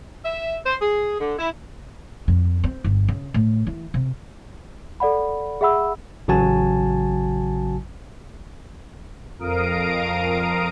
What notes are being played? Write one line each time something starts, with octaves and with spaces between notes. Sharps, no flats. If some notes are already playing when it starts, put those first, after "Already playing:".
E5
C5
G#4
D3
E4
F2
C4
G1
C#3
A2
E3
C3
A4 D5 F#5 B5
G#4 E5 F#5 B5 E6
A1 C#3 F#3 F#4 G#5 A5
F2 A#4 F5 D#6 D7